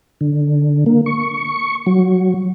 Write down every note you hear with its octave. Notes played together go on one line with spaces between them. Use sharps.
D3
A#3
C#6
F#3